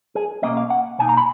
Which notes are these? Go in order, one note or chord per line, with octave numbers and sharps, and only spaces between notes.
G#4
B2 A#3 C#4 D#5
F5
F#5
B2 A#3 D#4 G#5
A#5
B5